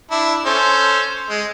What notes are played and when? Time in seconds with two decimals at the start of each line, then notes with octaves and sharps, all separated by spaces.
0.11 D4 E4
0.46 C#4 A4 C5
1.29 G#3